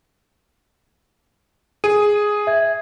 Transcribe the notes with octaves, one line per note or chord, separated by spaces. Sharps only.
G#4 D#7
E5 G#6